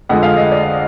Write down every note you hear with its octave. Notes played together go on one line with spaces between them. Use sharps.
F2 D3 G#3 F#5
F5
D#5
D5